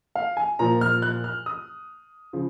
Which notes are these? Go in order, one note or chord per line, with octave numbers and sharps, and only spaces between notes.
F5
G#5
A#2 F3 A#5
F6
F#6
F6
D#6
C#3 F3